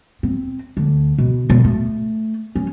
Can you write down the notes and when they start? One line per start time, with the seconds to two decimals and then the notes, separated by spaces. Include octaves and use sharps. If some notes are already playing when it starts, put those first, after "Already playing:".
0.23 C4
0.77 D2
1.18 B2
1.50 B2
1.65 A3
2.56 C#4